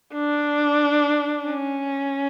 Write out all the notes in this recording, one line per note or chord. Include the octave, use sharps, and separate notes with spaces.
D4
C#4